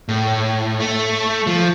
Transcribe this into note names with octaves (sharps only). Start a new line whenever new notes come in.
A2
A3
F3